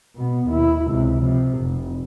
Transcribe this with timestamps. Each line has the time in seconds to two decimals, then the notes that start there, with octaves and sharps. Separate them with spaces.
0.15 B2 B3
0.48 D#2 E4
0.87 C#2 C3
1.19 C3 F3
1.59 F1